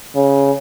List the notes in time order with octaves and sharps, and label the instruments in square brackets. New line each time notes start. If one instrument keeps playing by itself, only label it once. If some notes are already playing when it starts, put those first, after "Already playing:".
[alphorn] C#3